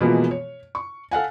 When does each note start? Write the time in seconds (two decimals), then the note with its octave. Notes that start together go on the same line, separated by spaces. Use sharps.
0.01 B2 E3 F3 G#3 A#3 B3
0.31 C#5
0.75 C#6
1.11 A4 F5 F#5 G#5